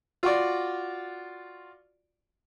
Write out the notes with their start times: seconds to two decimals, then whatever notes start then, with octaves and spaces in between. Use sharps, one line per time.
0.23 F4 F#4 D5